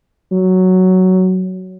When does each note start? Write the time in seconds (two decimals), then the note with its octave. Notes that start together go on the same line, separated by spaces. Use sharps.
0.32 F#3